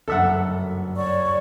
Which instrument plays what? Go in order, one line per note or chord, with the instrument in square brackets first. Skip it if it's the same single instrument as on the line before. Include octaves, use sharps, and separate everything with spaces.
[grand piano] F#1 [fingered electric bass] D2 G2 F#3 [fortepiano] A4 E5 F#5
[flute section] C#5 D5 C#6